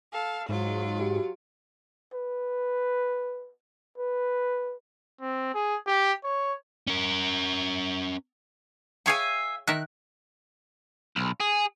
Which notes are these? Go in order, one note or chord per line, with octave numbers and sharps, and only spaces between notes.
A4 F5
G#2 F#3 F4
F#4 G4
B4
B4
C4
G#4
G4
C#5
C#4 A#4
G#4 C#5 E5 F5 G5 G#5
D#3 A#4 E5 F#6
B1
G#4